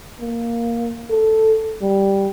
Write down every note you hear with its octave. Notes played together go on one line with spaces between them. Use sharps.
A#3
A4
G3